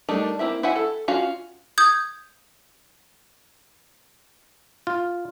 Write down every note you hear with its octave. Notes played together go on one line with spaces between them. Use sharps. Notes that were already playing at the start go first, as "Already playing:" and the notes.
G3 A3 D4 D#4 A#4
A#3 C4 E4 E5
E4 F#4 E5 F#5 G#5
A4
C#4 F4 F#4 F5
D#6 G6 G#6
F4